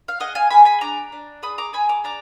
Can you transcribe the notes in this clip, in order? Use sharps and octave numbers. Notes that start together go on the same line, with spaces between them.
F5
G#4 D#5 F#5
F5 G#5
G#4 G#5 B5
G#5 B5
D4 A#5 D6
D4
G#4 B5 D#6
A#5 D6
G#4 G#5 B5
A#5 D6
D4 A#5 D6